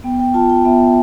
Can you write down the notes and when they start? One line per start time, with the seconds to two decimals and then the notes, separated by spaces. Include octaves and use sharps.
0.04 B3 G5
0.19 G5
0.34 F4 A5
0.49 G5
0.65 B3 E5